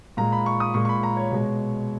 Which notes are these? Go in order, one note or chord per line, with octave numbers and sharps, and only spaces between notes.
A#2 G#3 A#5
B5
C#6
D#6
A#2 G#3 C#6
C#6
B5
A#5
C#5
B2 G#3